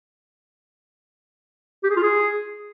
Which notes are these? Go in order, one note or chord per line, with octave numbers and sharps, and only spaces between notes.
G4
G#4
F4
G#4